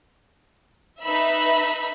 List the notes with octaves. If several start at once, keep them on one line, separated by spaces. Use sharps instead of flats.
D#4 B4 E5 B5